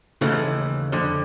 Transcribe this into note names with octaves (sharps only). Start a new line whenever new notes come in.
D#2 C#3 E3 A3
F2 D3